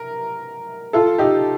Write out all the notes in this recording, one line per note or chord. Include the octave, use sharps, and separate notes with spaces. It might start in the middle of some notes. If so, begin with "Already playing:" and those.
Already playing: A#4
F4 A4
D#4 G4